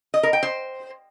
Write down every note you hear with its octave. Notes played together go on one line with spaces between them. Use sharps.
D#5
A#4
G5
C5